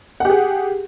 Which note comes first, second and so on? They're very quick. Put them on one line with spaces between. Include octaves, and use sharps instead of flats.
F#5 G4 G#4